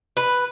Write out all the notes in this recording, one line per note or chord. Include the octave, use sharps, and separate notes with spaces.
B4